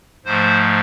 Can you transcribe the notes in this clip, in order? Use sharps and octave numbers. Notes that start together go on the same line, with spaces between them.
G#2 F3 A3 C5